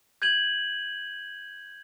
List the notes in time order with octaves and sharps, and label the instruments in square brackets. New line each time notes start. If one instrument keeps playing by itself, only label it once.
[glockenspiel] G6 G#6 D#7 F#7